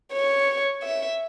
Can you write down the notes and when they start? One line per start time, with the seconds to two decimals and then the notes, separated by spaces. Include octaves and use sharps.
0.13 C#5
0.83 E5